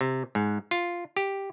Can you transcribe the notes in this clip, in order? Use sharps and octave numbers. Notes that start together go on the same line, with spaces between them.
C3
G#2
F4
G4